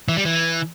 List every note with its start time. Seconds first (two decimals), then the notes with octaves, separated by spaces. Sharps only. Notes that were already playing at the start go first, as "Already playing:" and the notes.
0.08 E3
0.17 G3
0.25 E3